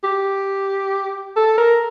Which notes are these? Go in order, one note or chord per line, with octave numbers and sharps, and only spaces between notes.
G4
A4
A#4